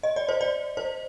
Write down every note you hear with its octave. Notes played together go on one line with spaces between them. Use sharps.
D#5
D5
C5
D5
C5